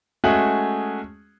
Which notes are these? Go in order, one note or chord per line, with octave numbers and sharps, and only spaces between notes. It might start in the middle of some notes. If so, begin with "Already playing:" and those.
G#3 A3 C#4 F#4 G#4 F#7